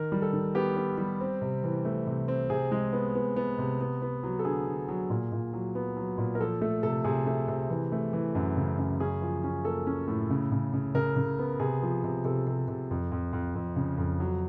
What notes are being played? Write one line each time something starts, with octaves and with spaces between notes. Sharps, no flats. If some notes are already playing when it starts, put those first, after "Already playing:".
Already playing: D#3 A#4
G3
A4
D#3
B3 G4
B3
G3
C4
C3
E3
A3
C3
C4
C3 G#4
G#3
B3
B3
B3
C3
B3
B3
F#3
A4
D3 G#4
D3
F#3
A#2
A#2
F#3
B3
F#3
A#2
A#4
F3 A4
A3 A4
C3 A4
C3 G#4
A3
C3
E3
A3
E3
F#2
C#3
F#2
C#4 G#4
F3
C#4
A#3 A4
C#4
A2
C#3
C#3
C#3
C#3 A#4
C#3
B3
C3 G#4
F3
C3
C3 A4
C3
C3
F2
F2
F2
F2
C#3
F2
F#3